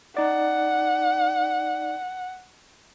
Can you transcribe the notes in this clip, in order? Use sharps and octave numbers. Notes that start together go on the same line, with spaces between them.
D#4 D5 F#5